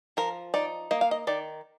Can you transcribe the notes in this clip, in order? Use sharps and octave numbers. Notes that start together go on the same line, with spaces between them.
F3 A#4
D#4 D5
A#3 D#5
F5
D#5
D#3 D5